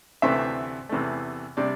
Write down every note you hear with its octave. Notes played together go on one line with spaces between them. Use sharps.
D2 C3 E3 A3 C4 E5
E2 C3 E3 A3
C3 G3 D4 D5